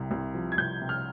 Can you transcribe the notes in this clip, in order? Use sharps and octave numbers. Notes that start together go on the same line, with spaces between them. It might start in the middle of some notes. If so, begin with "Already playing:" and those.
Already playing: C2 C3
C2
F3
G#6
C2 G6
C3
F6